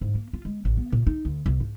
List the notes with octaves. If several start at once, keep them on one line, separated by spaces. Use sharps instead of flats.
G#2
A#3
F4
G#3
A1
B3
A#2
D#4
D2
C2
G#2